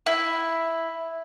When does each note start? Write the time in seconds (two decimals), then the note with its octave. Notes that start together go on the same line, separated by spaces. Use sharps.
0.06 E4